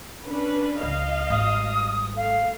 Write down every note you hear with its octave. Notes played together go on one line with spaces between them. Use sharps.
C#4 D4 B4
C#2 D#5 F5
G#1 G3 D#6
A3 F5